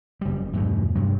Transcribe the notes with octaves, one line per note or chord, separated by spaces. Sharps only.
F#1 G3
E2 G2 B2 A3
G2 C3 F#3